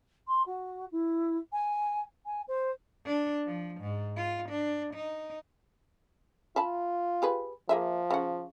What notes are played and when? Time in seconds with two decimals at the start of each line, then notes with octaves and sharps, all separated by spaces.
0.27 C6
0.46 F#4
0.92 E4
1.52 G#5
2.26 G#5
2.48 C5
3.05 D4
3.46 F3
3.81 G#2
4.16 F4
4.49 D4
4.94 D#4
6.56 F4 E5 A5 B5
7.22 G4 G#4 B4
7.69 F3 A#3 G#4 E5
8.11 C#3 F#5